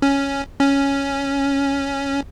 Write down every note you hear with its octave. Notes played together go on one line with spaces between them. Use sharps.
C#4
C#4